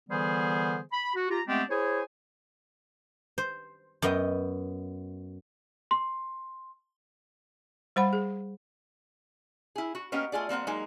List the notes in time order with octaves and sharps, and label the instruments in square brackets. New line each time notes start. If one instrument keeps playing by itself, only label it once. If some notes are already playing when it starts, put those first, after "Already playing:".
[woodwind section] D3 E3 G3 B3 G#4 C5
B5
F#4
F4 G4 A#5
G#3 A3 B3 C4 D4 G4
E4 G#4 C5 C#5 G#5
[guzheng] C5
F#2 B3 D#5 G5
[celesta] C6
[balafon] G3 C5 F#5 B5
G#4
[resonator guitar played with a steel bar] E4 G#4
F#4
A#3 B3 C#4 G4 D#5 G5
A3 F4 G#4 D5
G3 A#3 C4 F#5
F#3 G#3 A#3 D#4 G#4